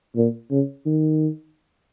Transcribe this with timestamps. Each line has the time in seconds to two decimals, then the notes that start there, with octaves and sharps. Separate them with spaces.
0.16 A#2
0.51 C#3
0.86 D#3